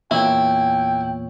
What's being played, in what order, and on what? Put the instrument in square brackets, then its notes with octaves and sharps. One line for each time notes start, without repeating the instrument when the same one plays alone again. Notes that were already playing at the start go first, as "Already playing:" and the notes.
[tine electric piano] E2 A#2 C#5 [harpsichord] E4 [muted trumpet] G5